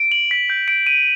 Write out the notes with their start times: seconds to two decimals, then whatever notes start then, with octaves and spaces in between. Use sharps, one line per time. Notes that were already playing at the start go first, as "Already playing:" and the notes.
Already playing: D7
0.12 F#7
0.31 B6
0.50 G6
0.68 D7
0.87 D#7